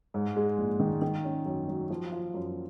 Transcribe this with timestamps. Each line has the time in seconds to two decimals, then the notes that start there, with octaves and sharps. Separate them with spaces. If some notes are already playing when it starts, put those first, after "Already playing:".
0.14 G#2
0.36 G#3
0.58 A#1
0.80 D#3
1.02 D#3
1.25 C#4
1.46 F#2
1.68 F#3
1.90 F3
2.12 F4
2.34 F#2